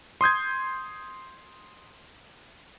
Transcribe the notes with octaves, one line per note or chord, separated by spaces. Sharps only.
C6 D#6 G6 G#6